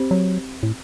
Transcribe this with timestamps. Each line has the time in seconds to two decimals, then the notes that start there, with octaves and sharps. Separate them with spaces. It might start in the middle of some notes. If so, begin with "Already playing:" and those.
Already playing: C4 G4 C5
0.11 F#3
0.63 A2